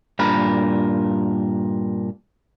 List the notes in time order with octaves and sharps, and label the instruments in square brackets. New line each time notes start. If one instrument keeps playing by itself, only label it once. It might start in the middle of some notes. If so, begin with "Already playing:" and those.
[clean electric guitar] G2 A#2 A#4 B5